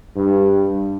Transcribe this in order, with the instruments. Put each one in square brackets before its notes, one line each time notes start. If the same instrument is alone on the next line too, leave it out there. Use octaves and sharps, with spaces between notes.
[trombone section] G2